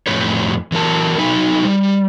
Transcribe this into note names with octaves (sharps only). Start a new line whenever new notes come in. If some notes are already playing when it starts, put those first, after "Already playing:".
F2 A2 E3 A#3 B4 C#5
E3 F#3 A#4 A5
F#3 D#4 B4
G3